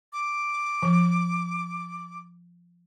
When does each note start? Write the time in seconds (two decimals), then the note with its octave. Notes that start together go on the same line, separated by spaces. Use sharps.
0.13 D6
0.83 F3